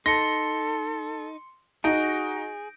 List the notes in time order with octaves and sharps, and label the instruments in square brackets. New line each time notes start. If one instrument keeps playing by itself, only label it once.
[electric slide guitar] D#4 [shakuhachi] A4 [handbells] C6 C#7 [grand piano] A#6
[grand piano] D#4 [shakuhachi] F#4 [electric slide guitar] G#4 [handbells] G6 A#6 D7